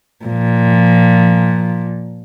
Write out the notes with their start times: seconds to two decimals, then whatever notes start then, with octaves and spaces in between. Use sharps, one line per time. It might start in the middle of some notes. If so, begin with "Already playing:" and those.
0.25 A#2 F3